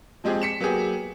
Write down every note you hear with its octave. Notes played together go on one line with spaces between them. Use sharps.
F3 G#3 C4 G4 G#4
B6 C#7 E7
F#3 A#3 B3 G4 G#4